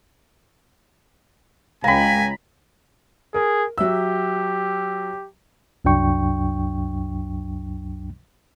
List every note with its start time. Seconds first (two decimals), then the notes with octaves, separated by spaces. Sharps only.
1.84 C#2 F5 G5 G#5 A#5 B5
3.34 G#4 A#4
3.78 F#3 G4 E5 E6
5.85 C2 F#2 F#3 D4 G5 C#6